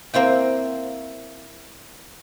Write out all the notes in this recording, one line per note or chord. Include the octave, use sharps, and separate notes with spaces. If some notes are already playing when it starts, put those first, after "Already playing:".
A#3 C4 E4 G5